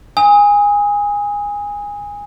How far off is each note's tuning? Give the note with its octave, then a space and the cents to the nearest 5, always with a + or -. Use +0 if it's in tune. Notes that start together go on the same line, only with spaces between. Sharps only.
G#5 -20 D#6 +25